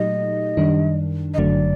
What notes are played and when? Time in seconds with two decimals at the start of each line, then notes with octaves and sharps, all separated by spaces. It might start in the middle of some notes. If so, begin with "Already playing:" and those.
Already playing: A#2 F#3 A3 D#4 G4 D#5
0.57 F#2 D#3 G3 D4
1.34 D#5
1.38 G1 F#2 D3 F#3 A3 D5